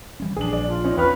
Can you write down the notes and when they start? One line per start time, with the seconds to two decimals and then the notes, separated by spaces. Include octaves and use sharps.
0.20 E3 G3 C#4
0.36 A#1 D4 G#4 F#7
0.53 D5
0.69 F4
0.84 C#4 D#4
0.97 E2 B4 G5 C#6 F6